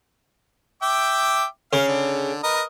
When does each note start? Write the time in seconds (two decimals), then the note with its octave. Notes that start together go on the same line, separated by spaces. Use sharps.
0.82 E5 G5 D6
1.73 C#3 F5
1.88 D3
2.44 A#4 B4 D#5